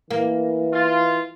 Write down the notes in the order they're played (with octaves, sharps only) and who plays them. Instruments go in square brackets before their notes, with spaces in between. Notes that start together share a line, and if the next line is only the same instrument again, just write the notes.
[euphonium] E3 [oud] A#3
[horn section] F4